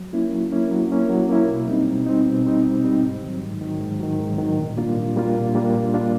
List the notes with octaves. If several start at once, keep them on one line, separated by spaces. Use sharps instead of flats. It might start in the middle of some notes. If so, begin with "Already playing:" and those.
Already playing: F#3
A#3 C#4 E4
F#3
A#3 C#4 E4
F#3
A#3 C#4 E4
F#3
A#3 C#4 E4
B2
G3 C4 D#4
B2
G3 C4 D#4
B2
G3 C4 D#4
B2
G3 C4 D#4
G#2
D#3 F#3
G#2
D#3 F#3
G#2
D#3 F#3
G#2
D#3 F#3
A#2
G3 A#3 D4 F4
A#2
G3 A#3 D4 F4
A#2
G3 A#3 D4 F4
A#2
G3 A#3 D4 F4